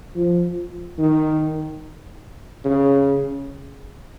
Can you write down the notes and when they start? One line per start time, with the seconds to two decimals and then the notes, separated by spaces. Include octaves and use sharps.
0.16 F3
0.98 D#3
2.64 C#3